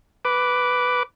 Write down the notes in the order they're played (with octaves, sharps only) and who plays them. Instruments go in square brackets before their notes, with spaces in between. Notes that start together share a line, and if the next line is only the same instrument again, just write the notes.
[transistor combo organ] B4 D6